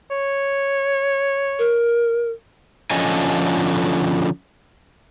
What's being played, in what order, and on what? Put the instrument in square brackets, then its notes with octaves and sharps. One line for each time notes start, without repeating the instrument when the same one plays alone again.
[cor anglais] C#5
[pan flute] A#4
[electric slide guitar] D3 F3 C#4 A4 D#5 G#5